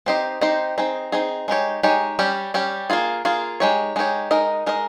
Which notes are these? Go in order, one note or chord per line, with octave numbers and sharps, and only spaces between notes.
C4 D#4 G4 C5 D#5
C4 D#4 G4 C5 D#5
C4 D#4 G#4
C4 D#4 G#4
G#3 D#4 G4 C#5
G#3 D#4 G4 C#5
G3 C#4 G4
G3 C#4 G4
A#3 F4 G#4
A#3 F4 G#4
G#3 D#4 G4 C#5
G#3 D#4 G4 C#5
G#3 D#4 A#4 D#5
G#3 D#4 A#4 D#5